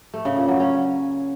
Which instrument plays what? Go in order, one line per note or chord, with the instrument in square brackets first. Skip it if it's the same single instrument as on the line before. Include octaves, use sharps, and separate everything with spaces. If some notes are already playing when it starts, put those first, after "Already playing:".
[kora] A3
C#3
A#2
F#3
C#4